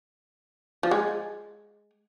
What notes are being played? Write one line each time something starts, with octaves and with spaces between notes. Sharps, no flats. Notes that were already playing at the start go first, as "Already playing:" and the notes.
F3
G#3